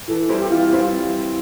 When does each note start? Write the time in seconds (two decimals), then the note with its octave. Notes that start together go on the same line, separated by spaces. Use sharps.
0.08 E3 A4
0.29 G3 C4 E4 A4
0.40 G4
0.50 E3 F4
0.72 G3 C4 E4